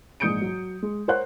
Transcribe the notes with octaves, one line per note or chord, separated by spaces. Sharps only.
A#1 G#2 D#6 G6 C#7 D7
F#3
G#3
A#4 C5 C#5 F#5 F#6